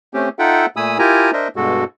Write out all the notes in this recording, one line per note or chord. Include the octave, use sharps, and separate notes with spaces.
A3 C4 C#4 G4
D#4 F4 A4 E5 F#5 G5
A#2 A3 G#5 B5 D#6 E6
E4 F4 G4 A#4 G#5 A#5
D4 A#4 C5 D#5 E5
G2 B2 G#3 F#4 A4